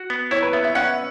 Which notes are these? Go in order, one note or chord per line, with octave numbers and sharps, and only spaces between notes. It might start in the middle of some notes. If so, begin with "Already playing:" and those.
Already playing: F#4
B3
E4 C#5
B4
B3 E5
E5
C#4 F#5